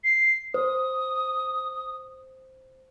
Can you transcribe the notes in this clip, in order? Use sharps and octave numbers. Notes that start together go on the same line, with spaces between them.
C7
C5 D#6